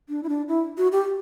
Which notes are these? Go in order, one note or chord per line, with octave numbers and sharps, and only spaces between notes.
D4
E4
D4
E4
F#4
G4